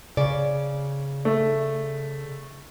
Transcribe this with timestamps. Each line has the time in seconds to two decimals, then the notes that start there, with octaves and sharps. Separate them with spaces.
0.17 C#3 D5
1.25 A3